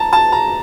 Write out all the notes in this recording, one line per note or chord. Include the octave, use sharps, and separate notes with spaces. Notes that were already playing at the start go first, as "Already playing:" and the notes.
Already playing: A5 A#5
A5
A#5